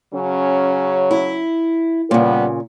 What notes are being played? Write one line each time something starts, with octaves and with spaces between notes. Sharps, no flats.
C#3 F#3 C#4
E4
A#2 C#3 G3 B3